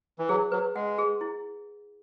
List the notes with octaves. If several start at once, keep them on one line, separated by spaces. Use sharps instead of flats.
E3
F#3 G#4
F#3 B4
G#3 F#5
G#4
E4